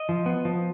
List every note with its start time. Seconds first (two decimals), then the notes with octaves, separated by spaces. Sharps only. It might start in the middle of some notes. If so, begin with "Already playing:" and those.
Already playing: D#5
0.09 F3
0.26 B3
0.45 F3